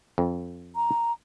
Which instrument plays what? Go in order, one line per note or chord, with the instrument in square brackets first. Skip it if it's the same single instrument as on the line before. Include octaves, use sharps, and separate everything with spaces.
[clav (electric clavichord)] F2
[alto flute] A#5